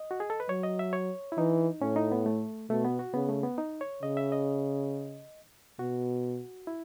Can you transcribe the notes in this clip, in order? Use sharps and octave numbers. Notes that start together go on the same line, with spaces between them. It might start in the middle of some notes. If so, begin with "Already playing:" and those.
Already playing: D#5
F#4
G#4
A4
B4
F#3 C#5
D#5
E5
C#5
E4
E3 D#4
A2 C#4
D#4
B3
A3
B2 A3
B3
F#4
C#3 B3
A3
B3
D#4
C#5
C#3 D#5
E5
D#5
B2 F#4
E4